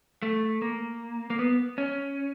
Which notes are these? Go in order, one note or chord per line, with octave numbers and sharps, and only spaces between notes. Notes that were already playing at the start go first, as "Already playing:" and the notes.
A3
A#3
A#3
B3
C#4